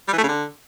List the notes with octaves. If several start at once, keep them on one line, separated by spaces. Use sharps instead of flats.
G3
E3
A3
C#3
D3